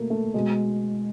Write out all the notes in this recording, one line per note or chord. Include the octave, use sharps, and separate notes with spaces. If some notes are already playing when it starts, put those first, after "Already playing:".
Already playing: B2 A3 A#3
A3
B2 G#3